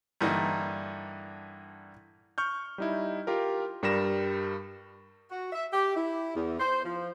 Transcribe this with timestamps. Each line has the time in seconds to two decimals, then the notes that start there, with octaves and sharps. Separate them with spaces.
0.21 G2 D3 E3 A#3 D#4
2.38 C#6 F6 G6
2.78 G3 D#4 E4
3.27 F4 G4 A#4
3.83 G2 G3 A#4 A#6 E7
5.30 F#4
5.52 E5
5.72 G4
5.95 E4
6.35 E2
6.59 C5
6.84 F3